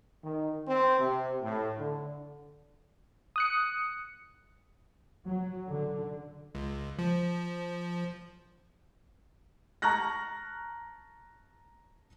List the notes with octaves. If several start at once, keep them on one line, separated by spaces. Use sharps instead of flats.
D#3
C4
C3
A2
D3
D#6 F#6 C#7
F#3
D3
C#2
F3
A5 A#5 C#6 F6 F#6 A#6